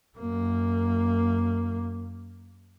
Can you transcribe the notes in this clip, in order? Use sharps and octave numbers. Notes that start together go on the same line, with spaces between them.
F#2 A#3